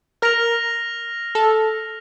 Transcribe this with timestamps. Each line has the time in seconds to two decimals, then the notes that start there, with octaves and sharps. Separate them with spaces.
0.22 A#4 F6 A#6 F7
1.35 A4